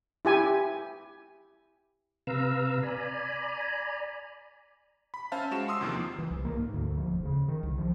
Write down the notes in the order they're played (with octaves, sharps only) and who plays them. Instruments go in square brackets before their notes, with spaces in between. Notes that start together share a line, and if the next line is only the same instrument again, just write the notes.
[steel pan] E4 G4 G#5
[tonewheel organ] C3 B4 F5 A#5 E6
D5 G#5 A#5 B5
[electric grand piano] B5
C#4 C5 E5 F5 A5
G#3 F#4 E7
C6 D#6 E6 C7
E2 C3 D#3 F3 A#3
[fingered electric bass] E3
C2
A#3
G#2
D2
F3
E1
C#3
D#3
C2
F3